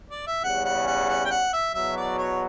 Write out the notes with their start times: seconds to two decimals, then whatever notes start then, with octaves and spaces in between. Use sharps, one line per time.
0.10 D5
0.27 E5
0.44 E2 C#3 G3 C#4 F#5
0.65 F#5
0.87 F#5
1.09 F#5
1.25 G5
1.31 F#5
1.53 E5
1.75 E2 B2 F#3 E5
1.97 D5
2.18 C#5